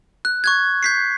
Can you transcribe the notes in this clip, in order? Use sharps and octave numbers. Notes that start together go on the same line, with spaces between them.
F#6
C#6 F#6 G#6
G6 B6 C7